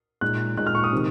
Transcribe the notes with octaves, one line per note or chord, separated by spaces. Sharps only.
A#2 G#3 D#4 F#6
A#2 G#3 D#4 F#6
F6
C#6
D#6
C3 D#3